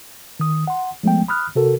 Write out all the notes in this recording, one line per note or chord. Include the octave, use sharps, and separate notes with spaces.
D#3 D#6
F#5 C6
F3 G#3 A3 B3 G5
B5 D#6 F6 F#6
C3 F#4 A4 A#4